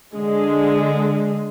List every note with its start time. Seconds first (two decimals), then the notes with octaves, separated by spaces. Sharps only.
0.15 D3 G#3